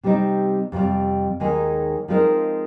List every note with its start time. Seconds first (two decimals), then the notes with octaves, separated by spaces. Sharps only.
0.03 C3 G3 C4 D#4
0.72 F2 C3 G3
1.40 D#2 D#3 G#3 D#4 G#4
2.08 F3 G#3 C4 D#4 A#4